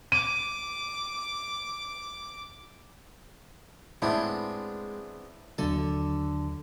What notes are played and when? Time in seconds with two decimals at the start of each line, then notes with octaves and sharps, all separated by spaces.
0.12 D6 D#7
4.02 A2 G#3 B3 C4 D4
5.58 D#2 D3 F#3 A4